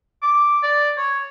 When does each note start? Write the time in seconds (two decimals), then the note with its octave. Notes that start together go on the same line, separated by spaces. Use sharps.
0.22 D6
0.63 D5
0.97 C#5